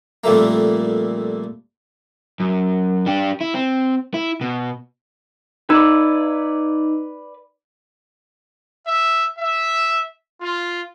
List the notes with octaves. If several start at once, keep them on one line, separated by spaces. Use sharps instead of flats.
F2 A#2 G3 A3 A#3
F#2
D4 G4
E4
C4
E4
B2
D#4 B4 D5
E5
E5
F4